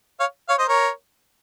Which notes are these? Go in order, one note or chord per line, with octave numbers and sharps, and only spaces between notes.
C#5 F5
C#5 F5
C5 D#5
A#4 C#5